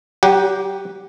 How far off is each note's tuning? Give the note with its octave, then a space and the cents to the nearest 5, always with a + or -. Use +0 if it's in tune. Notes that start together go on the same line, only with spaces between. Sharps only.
F#3 +40 G4 +0 F#5 +0